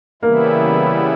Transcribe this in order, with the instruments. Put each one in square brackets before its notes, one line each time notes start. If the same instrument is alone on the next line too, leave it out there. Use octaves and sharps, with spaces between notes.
[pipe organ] C#3 E3 G3 B3 E4 [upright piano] A#3